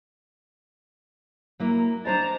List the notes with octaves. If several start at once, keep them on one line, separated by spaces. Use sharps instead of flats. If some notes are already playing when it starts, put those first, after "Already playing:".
F#3 A#3 E4
D4 C5 D#5 A5 A#5